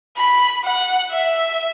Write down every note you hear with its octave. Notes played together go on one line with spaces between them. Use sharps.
B5
F#5
E5